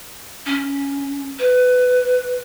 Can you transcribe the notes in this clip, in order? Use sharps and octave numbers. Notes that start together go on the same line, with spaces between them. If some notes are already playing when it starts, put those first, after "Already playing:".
C#4
B4